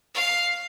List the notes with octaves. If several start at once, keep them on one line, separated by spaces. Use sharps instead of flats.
F5